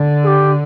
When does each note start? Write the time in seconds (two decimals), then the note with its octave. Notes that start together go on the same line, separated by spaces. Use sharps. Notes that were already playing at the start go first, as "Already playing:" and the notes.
Already playing: D3
0.22 G#4
0.27 G4